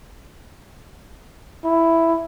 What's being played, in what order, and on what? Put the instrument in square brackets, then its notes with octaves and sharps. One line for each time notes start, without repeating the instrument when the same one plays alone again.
[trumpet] E4